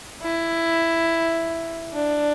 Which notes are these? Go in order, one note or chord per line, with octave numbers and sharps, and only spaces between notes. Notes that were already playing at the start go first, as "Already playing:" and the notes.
E4
D4